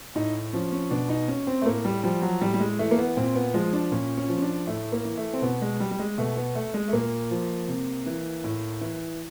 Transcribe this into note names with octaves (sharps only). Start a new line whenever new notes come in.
A2 D#4
F3 C#4
C#4
B2 D4
D#4
C#4
C4
A3
A2 A#3
G3
F3 G3
F#3
A2 G3
G3
G#3
E3 A3
A#3
B3
A#2 C4
B3
F3 G#3
D4
A#2 C#4
C#4
F3
C#4
D4
A2 A3
A#3
E3
A3
C4
B2 B3
G#3
G3
G3
G#3
B2 A3
B3
A3
G#3
A3
A#2 A#3
F3
C3
E3
A2
E3